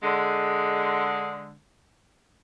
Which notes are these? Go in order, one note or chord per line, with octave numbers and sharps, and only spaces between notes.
D3 G#3